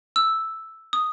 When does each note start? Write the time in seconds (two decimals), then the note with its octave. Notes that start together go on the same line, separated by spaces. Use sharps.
0.16 E6
0.93 D#6